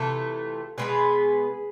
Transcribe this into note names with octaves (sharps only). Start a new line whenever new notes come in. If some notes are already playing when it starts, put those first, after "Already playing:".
Already playing: C3 E3 A3 F4 A4
B2 G#3 B3 G#4 B4